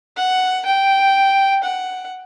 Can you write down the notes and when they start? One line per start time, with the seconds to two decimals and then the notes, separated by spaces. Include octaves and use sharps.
0.17 F#5
0.65 G5
1.63 F#5